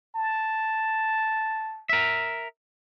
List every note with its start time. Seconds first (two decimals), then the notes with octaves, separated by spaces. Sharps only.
0.16 A5
1.89 A#4 E5